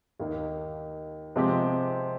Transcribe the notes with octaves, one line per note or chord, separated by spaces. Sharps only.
D#2 D#3 A#3 D#4
C3 F3 G#3 C4 G4